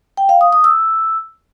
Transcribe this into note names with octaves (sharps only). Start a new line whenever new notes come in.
G5
F5
D#6
D#6
E6